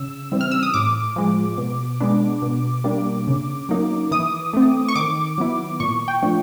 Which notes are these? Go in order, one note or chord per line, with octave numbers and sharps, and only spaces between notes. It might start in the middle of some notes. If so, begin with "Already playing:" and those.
Already playing: C#3 E6
E3 G3 C4
F6
E6
D#6
A2 D6
F3 G#3
B2
G#3 B3 D4
B2
G3 A#3 D4
C#3
F#3 A#3 D#4
E3 D#6
A3 C4
C#6
D#3 D6
F#3 B3 E4
A#2 C#6
G5
F3 A3 D4